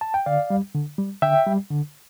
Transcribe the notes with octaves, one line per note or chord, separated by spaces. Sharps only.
A5
G5
D3 D5 F5
G3
D3
G3
D3 E5 G5
G3
D3